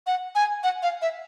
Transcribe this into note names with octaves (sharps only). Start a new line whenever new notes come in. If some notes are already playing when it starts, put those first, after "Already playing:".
F#5
G#5
F#5
F5
E5